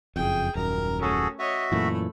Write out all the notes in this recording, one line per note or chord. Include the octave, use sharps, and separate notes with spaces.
F#1 F2 G#4 G5
D#1 F#2 A#4 A#5
A3 C#4 F#4 G#4 A4
F#4 C#5 D#5 E5
F#2 A#2 E3 A3 B5